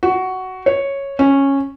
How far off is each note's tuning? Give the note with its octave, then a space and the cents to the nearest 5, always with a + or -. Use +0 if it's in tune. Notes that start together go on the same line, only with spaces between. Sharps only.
F#4 +10
C#5 -5
C#4 -10